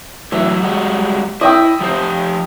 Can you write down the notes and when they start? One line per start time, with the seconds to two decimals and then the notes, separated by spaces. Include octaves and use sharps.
0.32 A2 E3 F#3 E5
0.63 G3 G#3 F#4
1.41 E4 D#5 G5 E6
1.81 F3 G4 C5